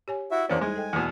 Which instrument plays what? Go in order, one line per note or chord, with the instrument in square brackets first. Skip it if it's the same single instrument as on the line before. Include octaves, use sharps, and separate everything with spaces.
[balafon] G4 C#5 G#5
[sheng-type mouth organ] E4 F#4 E5
[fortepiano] E2 C#4 [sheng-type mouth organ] A#3 D4 D5 [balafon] C5 C6
[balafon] G3 D#4 [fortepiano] G#3 [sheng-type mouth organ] G#5
[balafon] A4 D#5 G5
[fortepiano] E2 B2